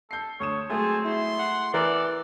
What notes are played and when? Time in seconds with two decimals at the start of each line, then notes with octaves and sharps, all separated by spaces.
0.11 A4 G6 C7
0.40 D2 C#5 D#6 E7
0.70 F#3 G#3 A3 C4 G#4 A5
1.04 E4 C6
1.39 F#5
1.74 E3 A4 A#4 D5